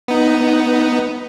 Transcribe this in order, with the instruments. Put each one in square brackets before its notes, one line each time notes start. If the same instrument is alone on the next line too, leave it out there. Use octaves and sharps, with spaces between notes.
[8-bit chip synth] B3 D#4